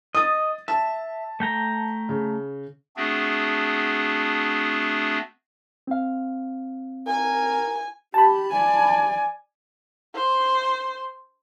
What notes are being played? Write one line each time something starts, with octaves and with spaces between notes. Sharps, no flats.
D#5 D#6 A6
E5 A5
A3 G5 A#5
C#3
A3 B3 C4 D4 F#4 G#4
C4 F5
A#4 G#5
G4 A5 B5
D5 G#5
C5